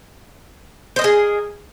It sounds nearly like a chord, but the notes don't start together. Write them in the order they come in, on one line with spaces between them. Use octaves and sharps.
C5 D#5 A#4 G#4